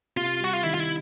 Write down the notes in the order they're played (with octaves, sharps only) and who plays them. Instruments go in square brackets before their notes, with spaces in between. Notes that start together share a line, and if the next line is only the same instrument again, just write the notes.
[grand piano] C3 [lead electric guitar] F4
[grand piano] G3 [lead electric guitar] F#4
[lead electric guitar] F4
[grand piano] D#3 [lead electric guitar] E4
[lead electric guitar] F4
E4